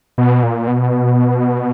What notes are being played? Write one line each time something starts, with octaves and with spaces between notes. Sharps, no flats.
B2
A#2
B2